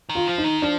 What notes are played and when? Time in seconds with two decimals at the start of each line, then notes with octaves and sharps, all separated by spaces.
0.09 D#3
0.15 F4
0.27 F3
0.38 D#4
0.44 D#3
0.62 F3 D4